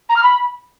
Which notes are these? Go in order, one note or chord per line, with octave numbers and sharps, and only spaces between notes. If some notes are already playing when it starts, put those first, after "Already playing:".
A#5
F6
B5